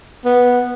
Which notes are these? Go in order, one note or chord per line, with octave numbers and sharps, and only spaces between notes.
B3